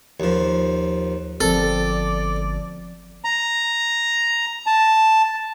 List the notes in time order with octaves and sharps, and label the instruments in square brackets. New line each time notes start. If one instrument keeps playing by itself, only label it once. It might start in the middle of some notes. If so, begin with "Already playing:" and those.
[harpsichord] D#2 F3
[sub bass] G1 [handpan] F3 C4 [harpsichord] A4 [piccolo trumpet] D5
[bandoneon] A#5
A5